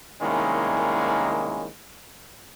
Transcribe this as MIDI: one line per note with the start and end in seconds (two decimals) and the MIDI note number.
0.21 1.67 36
0.21 1.67 51
0.21 1.67 56
0.21 1.67 58
0.21 1.67 61
0.21 1.67 64